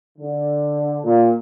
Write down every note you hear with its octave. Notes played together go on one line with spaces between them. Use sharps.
D3
A#2